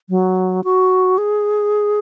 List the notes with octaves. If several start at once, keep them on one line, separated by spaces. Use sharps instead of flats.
F#3
F#4
G#4